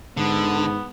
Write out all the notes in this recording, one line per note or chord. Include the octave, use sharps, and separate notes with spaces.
G#2 D3 B3